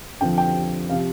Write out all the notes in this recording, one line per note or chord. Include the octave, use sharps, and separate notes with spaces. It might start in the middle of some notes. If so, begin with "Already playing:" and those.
F2 D3 F3 G5
G5
C3 F3 F5